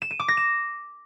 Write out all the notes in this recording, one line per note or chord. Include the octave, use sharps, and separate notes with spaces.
E7
D#7
D6
A#6
E7